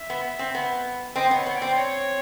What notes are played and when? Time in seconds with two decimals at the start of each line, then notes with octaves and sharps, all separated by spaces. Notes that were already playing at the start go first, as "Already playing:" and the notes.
Already playing: E5
0.10 B3
0.39 C4
0.55 B3
1.16 C4 D#5
1.31 B3 C#5
1.46 B3
1.56 D5
1.62 C4
1.77 C#5